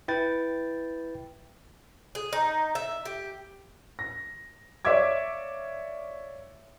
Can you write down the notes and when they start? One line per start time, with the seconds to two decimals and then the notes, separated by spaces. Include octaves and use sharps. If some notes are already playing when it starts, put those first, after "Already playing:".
0.08 E4 B4 G5 A6
2.15 G#4
2.33 D#4
2.75 E5
3.05 G4
3.99 A#6
4.85 C#5 D5 E5 F5 D6 G#6